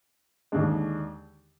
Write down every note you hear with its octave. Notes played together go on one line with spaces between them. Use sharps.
D#2 D3 G#3 D4